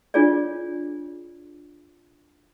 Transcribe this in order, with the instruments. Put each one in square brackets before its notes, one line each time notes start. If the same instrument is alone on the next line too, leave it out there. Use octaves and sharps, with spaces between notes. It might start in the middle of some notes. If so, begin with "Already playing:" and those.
[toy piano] D4 F4 G#4 C#5 D5